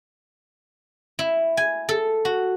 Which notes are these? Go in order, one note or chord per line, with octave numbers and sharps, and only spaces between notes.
E4
G#5
A4
F#4